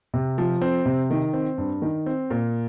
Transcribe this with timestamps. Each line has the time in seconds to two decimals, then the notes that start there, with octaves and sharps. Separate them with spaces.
0.14 C3
0.38 F3
0.62 C4
0.86 C3
1.11 D#3
1.33 C4
1.58 G2
1.82 D#3
2.06 C4
2.31 A#2